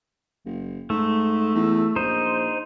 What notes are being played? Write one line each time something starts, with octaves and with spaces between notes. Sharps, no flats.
F#1
G#2 A3
E2
A#1 D#4 C5